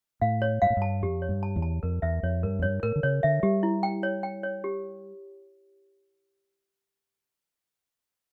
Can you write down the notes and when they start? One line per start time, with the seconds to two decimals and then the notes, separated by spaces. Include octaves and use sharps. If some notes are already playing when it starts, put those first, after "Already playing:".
0.22 A2 F5
0.42 C#5
0.62 G2 F5
0.70 A2
0.77 G2 A5
1.02 F2 G4
1.22 C#5
1.29 G2
1.43 A5
1.56 E2
1.62 A5
1.83 F2 A#4
2.02 E2 E5
2.23 F2 C#5
2.43 G2 A#4
2.59 F2
2.63 G2 C#5
2.83 A2 A#4
2.96 D3
3.03 C#3 C#5
3.23 D3 E5
3.43 G3 G4
3.63 E4
3.83 G5
4.03 C#5
4.23 G5
4.43 C#5
4.64 G4